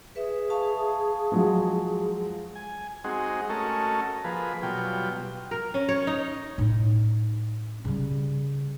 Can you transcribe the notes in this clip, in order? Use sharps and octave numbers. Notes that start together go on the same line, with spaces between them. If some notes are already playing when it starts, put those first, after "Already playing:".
G#4 B4 E5
F5 A5 C#6
F3 F#3 G#3
G#5
G#3 C4 D#4 F#4 G#4
A3 C#4 F#4 A4 A#4 D#5
F3 A#3 G#4 B4
B2 F#3 G3 F4 G5
A#4
C#4
C#5
D#4
A2 D#4
C#3 G3